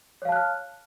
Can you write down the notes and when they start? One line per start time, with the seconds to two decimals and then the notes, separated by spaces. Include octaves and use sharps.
0.22 C#5
0.25 F5
0.29 A5
0.32 F#6
0.36 F6